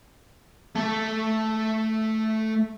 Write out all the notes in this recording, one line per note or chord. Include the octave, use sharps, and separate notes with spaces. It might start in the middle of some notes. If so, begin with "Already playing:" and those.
A3 A4